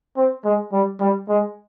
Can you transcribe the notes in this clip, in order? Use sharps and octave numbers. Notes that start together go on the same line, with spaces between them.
C4
G#3
G3
G3
G#3